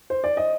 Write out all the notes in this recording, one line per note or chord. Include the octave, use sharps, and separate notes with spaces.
C5
D5
D#5